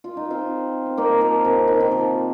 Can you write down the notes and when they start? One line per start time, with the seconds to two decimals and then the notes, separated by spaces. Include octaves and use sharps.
0.04 F4
0.17 D#4
0.30 C4 F4
0.86 C4
0.97 A#3 D#4
1.21 F3 A#3
1.45 C3
1.68 D#3
1.80 D#3
1.91 F3